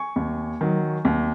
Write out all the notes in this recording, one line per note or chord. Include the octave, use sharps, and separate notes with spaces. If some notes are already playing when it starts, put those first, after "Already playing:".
Already playing: G#5 C#6
D#2
D#3 F#3
D#2